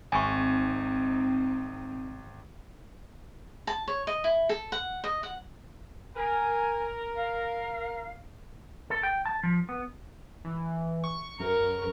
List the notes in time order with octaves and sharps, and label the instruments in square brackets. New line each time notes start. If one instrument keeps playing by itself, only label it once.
[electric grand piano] G#1 [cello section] C4 D#4 [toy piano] G#5 C#6
[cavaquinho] A5
C#5
D#5
E4
A4
F#5
D#5
F#5
[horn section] A#4 [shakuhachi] G#5
[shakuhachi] F5
[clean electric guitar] A4
G5
A5
F3
B3
[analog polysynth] E3
C#6
[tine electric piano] F#2 [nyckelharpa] A#4